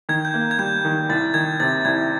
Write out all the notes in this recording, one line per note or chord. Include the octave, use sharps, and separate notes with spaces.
D#3 G#6
G6
A#3
G#6
G3 G6
D#3
C2 A6
D#3 G#6
C3 A6
C2 G#6